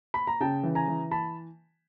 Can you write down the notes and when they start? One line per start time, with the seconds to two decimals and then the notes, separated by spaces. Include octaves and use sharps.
0.14 B5
0.27 A#5
0.41 C#3 G5 A5
0.63 E3
0.75 G#5 A#5
0.88 E3
1.11 A5 B5